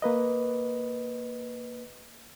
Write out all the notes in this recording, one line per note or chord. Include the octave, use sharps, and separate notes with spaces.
A#3 B4 D#5